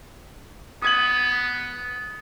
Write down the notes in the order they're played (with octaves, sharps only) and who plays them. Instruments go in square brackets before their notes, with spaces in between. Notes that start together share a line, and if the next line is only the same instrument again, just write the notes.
[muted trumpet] B3 [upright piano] D#6 G#6 F#7